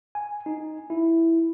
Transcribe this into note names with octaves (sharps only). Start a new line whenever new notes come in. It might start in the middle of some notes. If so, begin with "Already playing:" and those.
G#5
D#4
E4